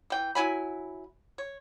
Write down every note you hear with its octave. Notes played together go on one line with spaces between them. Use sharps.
E3 G5
F#3 E4 G#5 B5
C#5